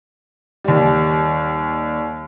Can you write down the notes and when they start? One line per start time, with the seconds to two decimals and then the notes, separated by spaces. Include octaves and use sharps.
0.64 D#2 G3